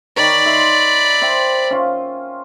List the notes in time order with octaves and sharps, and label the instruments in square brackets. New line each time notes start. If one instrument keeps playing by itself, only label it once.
[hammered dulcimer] D#3 A#4 C#5 [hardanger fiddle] D5 B5
[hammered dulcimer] E5 C6
C5 E5 G5
C#4 F4